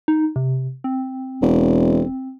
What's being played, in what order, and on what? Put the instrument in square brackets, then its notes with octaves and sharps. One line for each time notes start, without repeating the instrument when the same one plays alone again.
[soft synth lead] D#4
C3
C4
[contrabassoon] E1